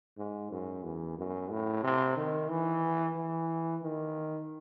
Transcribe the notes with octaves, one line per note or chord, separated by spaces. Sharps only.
G#2
F#2
E2
F#2
A2
C3
D#3
E3
E3
D#3